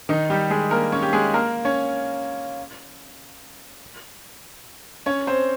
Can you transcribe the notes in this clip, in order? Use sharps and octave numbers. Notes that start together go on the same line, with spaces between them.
D#3 D#4
G3 G4
G#3 G#4
A#3 A#4
C#4 C#5
G4
G#3 G#4
A#3 A#4
C#4 C#5
C#4 C#5
C4 C5